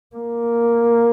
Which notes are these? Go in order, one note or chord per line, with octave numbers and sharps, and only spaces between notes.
A#3